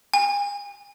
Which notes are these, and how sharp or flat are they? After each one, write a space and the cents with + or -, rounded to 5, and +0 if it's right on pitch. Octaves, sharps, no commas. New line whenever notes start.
G#5 -40